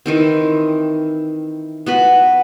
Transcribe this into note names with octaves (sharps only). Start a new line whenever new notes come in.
D#3 E3 C4
B3 F#4 B4